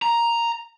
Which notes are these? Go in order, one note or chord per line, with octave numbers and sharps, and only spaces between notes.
A#5